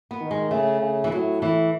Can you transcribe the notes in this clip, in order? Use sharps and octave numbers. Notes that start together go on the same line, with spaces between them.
B3
D#3
G#3
C#3 A3
C#3
E3
A2 F#3
A2 E3